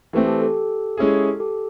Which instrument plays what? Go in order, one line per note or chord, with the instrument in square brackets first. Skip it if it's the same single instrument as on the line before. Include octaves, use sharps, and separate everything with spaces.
[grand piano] E3 A3 C4 [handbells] G4 A4
[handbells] G4 A4
G4 A4
[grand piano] G#3 C#4 E4 G#4
[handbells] G4 A4